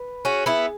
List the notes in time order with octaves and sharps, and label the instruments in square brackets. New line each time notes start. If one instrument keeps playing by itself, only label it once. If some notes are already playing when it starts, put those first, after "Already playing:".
Already playing: [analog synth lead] B4
[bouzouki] C#4 F#4 [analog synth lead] G#4
[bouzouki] B3 E4